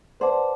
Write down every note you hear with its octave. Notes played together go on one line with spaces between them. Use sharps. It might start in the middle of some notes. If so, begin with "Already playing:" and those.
B4 C5 D5 F#5 A5 D6